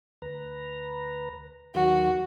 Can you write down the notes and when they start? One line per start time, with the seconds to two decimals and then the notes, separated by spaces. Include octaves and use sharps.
0.22 D2 B4 A#5
1.75 D#2 D#3 F#3 F#4